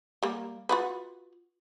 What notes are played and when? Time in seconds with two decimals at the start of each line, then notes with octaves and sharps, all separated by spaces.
0.23 G3 A#3
0.69 F4 F#4 B4